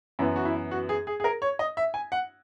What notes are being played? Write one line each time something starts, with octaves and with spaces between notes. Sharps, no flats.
F#2 E3 B3 E4
F#4
E4
F#4
G#4
G#4
G#4
A#4
C#5
D#5
E5
G#5
F#5